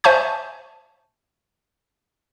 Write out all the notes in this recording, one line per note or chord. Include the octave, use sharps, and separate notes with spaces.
C5 E5 G#5 A5 C#6 G6